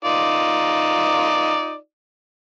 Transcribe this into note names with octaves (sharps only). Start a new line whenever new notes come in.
D#4 F4 D5